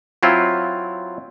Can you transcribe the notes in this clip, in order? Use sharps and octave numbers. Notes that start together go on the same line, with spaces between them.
F#3 C4 E4 F4